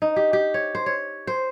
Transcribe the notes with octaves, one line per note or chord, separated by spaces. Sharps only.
D#4
G4
G4
C#5
C5
C#5
C5